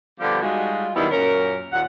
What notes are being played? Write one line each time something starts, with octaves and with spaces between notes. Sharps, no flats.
D3 F3 G3 B3 G4
G3 G#3 D#4 F4 F#4
D#3 F#3 G3 B3 D#4 E4
F#2 A#2 C#4 A#4
D#2 A#2 F#5